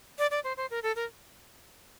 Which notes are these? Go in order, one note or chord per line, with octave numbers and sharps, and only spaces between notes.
D5
D5
C5
C5
A#4
A4
A#4